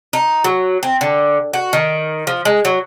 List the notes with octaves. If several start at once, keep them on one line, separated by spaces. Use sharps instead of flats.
D#4
F#3
C4
D3
F#4
D#3
F3
G#3
F#3